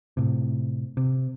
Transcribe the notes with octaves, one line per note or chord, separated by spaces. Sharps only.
A2 C3
C3